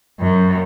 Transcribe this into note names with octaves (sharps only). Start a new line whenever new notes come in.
F#2